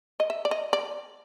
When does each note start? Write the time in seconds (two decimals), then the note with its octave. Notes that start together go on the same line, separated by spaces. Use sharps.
0.20 D#5
0.30 E5
0.45 D5
0.51 D#5
0.73 D5